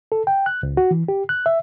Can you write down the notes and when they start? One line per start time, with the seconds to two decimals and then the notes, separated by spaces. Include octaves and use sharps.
0.12 A4
0.27 G5
0.46 F#6
0.63 C#2
0.77 F#4
0.91 E3
1.08 G4
1.29 F#6
1.46 E5